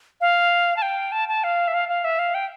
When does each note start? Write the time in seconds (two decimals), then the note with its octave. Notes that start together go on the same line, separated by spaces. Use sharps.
0.21 F5
0.77 A5
0.82 G5
1.12 A5
1.28 A5
1.44 F5
1.68 E5
1.74 F5
1.89 F5
2.05 E5
2.19 F5
2.34 G5